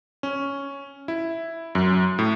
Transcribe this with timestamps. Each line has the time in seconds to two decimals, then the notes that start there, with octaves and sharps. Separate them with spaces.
0.23 C#4
1.08 E4
1.75 F#2
2.19 A2